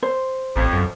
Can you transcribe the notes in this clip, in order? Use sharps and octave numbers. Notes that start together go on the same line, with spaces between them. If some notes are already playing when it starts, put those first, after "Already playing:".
C5
A1 F2
F#2